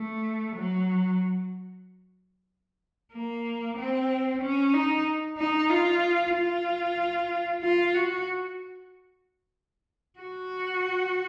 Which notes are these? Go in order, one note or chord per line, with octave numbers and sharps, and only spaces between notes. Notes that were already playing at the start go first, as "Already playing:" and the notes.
Already playing: A3
F#3
A#3
C4
C#4
D#4
D#4
F4
F4
F4
F#4
F#4